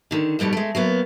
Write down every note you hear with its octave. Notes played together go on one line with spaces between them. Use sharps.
D3 D#3
F2 G#2 B2 G3 A3
G#3 A3
F#3 A#3 B3